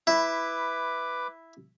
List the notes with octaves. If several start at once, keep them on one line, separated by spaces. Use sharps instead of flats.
E4 B4 D6